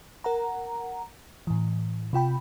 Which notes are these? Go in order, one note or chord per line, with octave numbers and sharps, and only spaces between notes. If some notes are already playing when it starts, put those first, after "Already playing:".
A#4 F#5 A#5
A2 E3
C3 F4 G5 B5